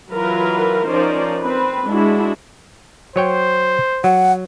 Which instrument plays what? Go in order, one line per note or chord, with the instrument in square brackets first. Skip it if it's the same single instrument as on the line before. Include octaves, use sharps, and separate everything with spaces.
[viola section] E3 F#3 F4 A#4 B4
F3 C#4 D#4 A#4 C5 D5
C4 B4
G#3 D4 E4 F#4
[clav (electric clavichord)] F#3 C#5 G5 [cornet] C5
[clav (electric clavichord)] F#3 [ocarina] F#5